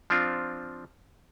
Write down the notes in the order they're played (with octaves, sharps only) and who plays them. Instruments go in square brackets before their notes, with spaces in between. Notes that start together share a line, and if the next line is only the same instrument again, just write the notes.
[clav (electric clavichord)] F3 C4 D4 F4